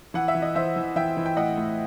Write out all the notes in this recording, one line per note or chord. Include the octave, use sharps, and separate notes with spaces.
E3 F#5
E5
E3
D#5
E3 C5 E5
E3
E3 E5 G5
E3
G5
A2 D#5 F#5
A2